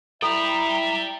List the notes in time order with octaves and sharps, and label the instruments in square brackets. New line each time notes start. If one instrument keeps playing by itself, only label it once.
[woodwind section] E4 E5 [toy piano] A4 [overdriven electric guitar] D5 G5 [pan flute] A#5